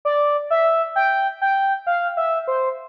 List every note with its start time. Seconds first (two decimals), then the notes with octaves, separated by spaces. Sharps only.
0.05 D5
0.50 E5
0.96 G5
1.41 G5
1.87 F5
2.17 E5
2.47 C5